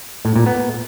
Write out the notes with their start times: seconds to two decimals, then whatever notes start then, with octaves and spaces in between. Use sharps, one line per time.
0.25 A2
0.36 A#2
0.46 B3